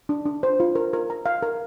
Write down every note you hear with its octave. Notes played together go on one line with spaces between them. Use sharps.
D4
D4
C5
F4
A#4
A#4
A#5
F5
A#4